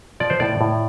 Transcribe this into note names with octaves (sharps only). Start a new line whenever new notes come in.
F3 D5
C5
A2 D5
A2